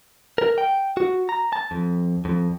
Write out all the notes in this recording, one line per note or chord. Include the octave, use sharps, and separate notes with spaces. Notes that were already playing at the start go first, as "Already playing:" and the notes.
A#4
G5
F#4
A#5
A5
F2
F2